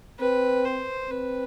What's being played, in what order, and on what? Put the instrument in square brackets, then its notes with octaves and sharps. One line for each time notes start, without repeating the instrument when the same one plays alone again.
[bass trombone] C4 [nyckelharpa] B4
[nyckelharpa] C5
[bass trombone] C4 [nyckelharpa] B4